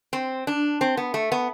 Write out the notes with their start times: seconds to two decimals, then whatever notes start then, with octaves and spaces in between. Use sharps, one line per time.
0.13 C4
0.47 D4
0.81 C4
0.97 B3
1.14 A3
1.32 B3